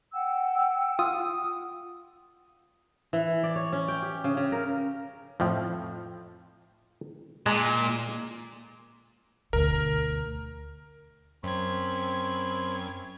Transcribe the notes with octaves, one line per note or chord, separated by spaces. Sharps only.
F#5 G5 E6
F4 D#6
E3
D5
C#5
C#4
G5
G4
C#3
C#3
A#4
F2 A2 F3
A#2 G#3 A5
D2 B2 A#4
F#2 C4 B5 C#6 G#6